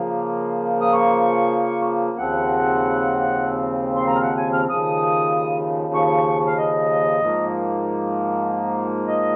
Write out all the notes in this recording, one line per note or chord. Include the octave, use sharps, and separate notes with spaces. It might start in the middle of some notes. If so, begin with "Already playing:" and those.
Already playing: C#3 F3 A#3
D#6
C#6
D#2 C#3 F3 C4 F#5
C6
A#5
F5
F#5
G#5
F6
D#2 C#3 F3 D#6
C#6
F5
D#5
G#2 F3 A#3
D#5